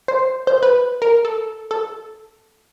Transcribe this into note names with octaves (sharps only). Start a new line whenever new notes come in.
C5
C5
B4
A#4
A4
A4